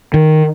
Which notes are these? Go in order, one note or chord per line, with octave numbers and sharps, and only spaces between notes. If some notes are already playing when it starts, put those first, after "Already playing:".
D#3